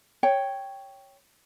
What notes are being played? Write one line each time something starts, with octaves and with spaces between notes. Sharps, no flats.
C#5 G5